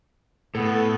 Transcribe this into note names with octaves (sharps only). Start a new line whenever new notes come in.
A2 B3 A4